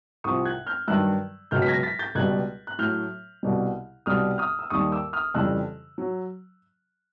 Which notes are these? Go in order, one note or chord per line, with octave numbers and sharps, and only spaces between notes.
C2 C3 F3 C#6 D#6
F#6 G#6
F6 G6
G2 D#3 F#3 E6 F#6
C#2 B2 F#3 F6 G6
B6
G#6 A#6
A6 B6
G6 A6
C#2 B2 G3 F#6 G#6
F#6
A2 F#3 F6 G6
C2 B2 G3
C2 B2 G3 D#6 F6
D#6 F6
E6
D#2 D#3 G3 C#6 D#6
D6 E6
D#6 F6
F2 C#3 E3 G3 E6 F#6
F#3